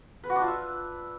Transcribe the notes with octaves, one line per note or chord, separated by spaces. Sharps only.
B4
F#4
D4
F4
E5